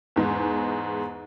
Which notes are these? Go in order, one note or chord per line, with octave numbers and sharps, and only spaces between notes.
E2 G#2 G#3